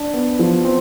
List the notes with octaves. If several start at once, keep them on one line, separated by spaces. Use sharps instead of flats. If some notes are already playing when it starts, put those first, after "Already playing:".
Already playing: D4
B3
F3
C4